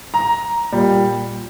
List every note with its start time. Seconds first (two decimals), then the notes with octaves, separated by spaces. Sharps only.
0.14 A#5
0.72 A#2 G3